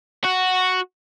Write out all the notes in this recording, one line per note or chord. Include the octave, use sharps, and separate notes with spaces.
F#4